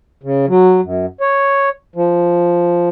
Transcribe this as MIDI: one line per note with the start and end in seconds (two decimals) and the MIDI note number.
0.23 0.46 49
0.48 0.81 54
0.83 1.06 42
1.21 1.69 73
1.95 2.89 53